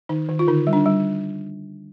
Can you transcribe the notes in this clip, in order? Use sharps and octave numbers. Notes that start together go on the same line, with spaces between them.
D#3 D#4
D#3
F4
D3 D#4
G3
D4
G3